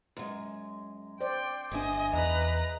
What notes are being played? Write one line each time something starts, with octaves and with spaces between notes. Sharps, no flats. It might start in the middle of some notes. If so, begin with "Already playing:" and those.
F#2 G#3
C5 D5 G5
G1 D4 G#4 D#5 E5 G#5
E2 B4 D#5 A#5